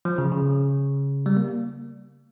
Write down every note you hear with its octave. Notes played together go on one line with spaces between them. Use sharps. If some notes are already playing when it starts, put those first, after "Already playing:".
F3
C#3
C#3
G3
A#3